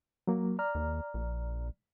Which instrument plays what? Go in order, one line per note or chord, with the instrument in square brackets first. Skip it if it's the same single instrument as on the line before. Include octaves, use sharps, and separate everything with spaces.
[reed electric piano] F#3 A#3
D5 A#5 F6
[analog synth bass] D#2
A#1